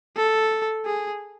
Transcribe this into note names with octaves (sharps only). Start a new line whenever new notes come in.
A4
G#4